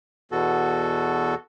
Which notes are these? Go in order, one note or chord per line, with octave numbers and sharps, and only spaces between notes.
E2 B2 F#4 A4